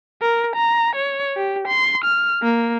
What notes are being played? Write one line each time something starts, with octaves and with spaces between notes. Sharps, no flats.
A#4
A#5
C#5
G4
C6
F6
A#3